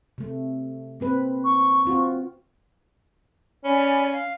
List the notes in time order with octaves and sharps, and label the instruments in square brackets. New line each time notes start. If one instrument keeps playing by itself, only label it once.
[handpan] C3 A3
A#3 C4 B4
[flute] C#6
[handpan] C4 F4 F#4
[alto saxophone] C#4 [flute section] D5 G#5 B5
[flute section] F5